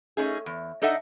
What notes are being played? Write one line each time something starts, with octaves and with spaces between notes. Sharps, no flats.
A3 C#4 D#4 G#4
E2
D4 D#4 A4 D#5 E5 F#5